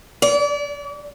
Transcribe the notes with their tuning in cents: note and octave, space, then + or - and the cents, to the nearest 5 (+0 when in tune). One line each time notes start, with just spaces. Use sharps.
D5 -35